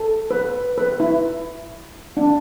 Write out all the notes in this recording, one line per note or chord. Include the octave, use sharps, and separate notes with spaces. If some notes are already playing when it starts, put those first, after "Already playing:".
Already playing: A4
B4
B4
E4
D4